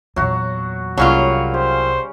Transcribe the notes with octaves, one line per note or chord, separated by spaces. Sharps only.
E2 A#2 F#3 F#4
C2 C#3 F#3 G3 A#3 C#4 F4 C#6
G4 C5